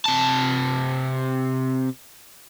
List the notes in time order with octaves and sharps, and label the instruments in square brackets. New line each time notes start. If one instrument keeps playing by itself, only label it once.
[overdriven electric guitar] C3 A5